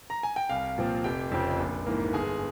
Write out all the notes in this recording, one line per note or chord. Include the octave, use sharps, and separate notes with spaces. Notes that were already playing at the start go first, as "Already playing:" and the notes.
A#5
G#5
G5
C2 F5
A#2 F3 C4
F1 G4 G5
F2 C#3 F3 C4
A#1
G#2 E3 A#3
G1 G#4 G#5